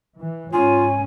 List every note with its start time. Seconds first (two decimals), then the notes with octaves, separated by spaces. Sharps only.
0.20 E3
0.53 G#2 C#4 F4 G#5